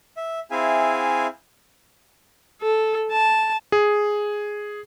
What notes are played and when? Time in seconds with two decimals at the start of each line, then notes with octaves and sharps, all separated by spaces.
0.17 E5
0.51 C4 E4 G#4 E5 F5 G#5
2.61 A4
3.11 A5
3.72 G#4